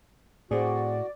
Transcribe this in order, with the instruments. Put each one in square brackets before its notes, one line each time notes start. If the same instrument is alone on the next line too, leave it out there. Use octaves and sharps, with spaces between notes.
[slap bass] A2 [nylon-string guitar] C4 G#4 [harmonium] F#4 [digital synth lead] D5